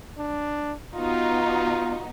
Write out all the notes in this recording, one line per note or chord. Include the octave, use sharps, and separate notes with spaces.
D4
B3 D#4 F4 F#4